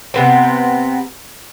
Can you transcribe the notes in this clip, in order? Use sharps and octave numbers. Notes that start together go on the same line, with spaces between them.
C3 B3 C4